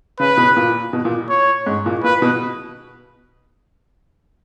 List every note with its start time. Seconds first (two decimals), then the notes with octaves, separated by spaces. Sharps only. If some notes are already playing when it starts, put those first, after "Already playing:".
0.20 C#3 B4
0.37 B2
0.56 A#2
0.93 B2
1.05 A#2
1.29 C#5
1.67 G#2
1.86 A#2
2.04 A#2 B4
2.22 B2